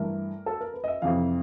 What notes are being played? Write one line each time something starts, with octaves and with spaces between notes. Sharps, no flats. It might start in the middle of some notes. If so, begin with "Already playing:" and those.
Already playing: G2 E3 A3 A#4
A4
A#4
B4
D#5
E5
F2 C3 E3 F5